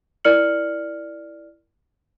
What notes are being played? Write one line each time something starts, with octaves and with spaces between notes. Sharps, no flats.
E4 A#4 D5 F6 C#7 F#7